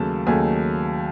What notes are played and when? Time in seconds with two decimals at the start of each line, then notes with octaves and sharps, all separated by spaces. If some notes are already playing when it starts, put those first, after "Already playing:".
Already playing: D#2 C#3 F#3 A3 A5
0.27 D#2 C#3 F#3 A3 G#5